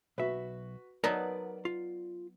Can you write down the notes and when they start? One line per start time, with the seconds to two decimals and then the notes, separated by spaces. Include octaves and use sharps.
0.18 B1 F#4 B4 E5
1.04 F#3 B3 D#4 A#4 B4 D5 A5
1.65 F4